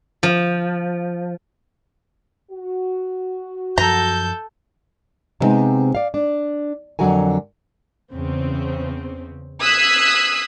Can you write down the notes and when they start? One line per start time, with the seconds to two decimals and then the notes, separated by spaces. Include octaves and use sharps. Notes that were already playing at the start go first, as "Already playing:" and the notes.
0.23 F3
2.51 F#4
3.78 F#2 F3 A4 A#5 G6
5.40 C3 G3 G#3 B3 C4 D#4
5.95 D5 F5
6.14 D4
6.99 F2 D3 F#3 F#4 A#4 G#5
8.12 E2 C#3 C4
9.61 D#6 E6 F#6 G#6 B6 C7